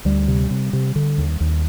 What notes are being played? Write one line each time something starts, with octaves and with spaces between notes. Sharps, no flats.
D2 G3
C3
C3
C3
D3
D#2
D#2